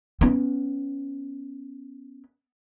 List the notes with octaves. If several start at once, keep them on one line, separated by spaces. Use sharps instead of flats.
B3 C#4